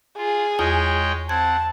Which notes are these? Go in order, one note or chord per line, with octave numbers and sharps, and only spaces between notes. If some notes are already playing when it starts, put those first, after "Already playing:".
F4 G#4
E2 G#3 F4 C#5 G5 D#6
C4 F#5 A5 G#6